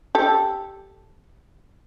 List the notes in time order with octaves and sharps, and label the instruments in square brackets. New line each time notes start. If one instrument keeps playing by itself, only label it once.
[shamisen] G4 A4